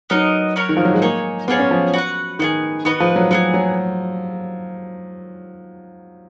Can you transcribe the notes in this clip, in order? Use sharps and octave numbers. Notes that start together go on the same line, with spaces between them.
F#3 B3 D#4 A#4 D#5
C#4 F#4 A#4 C#5
D#3
F3
F#3
G#3
A#3 D#4 G#4 C#5
A#3 B3 F4 G#4 C#5
C#4
F3
F#4 B4 F#5
D#3 B3 F4 G#4
D#3 B3 F#4 B4 D#5
F3
F#3
F#3 B3 F4 G#4
F#3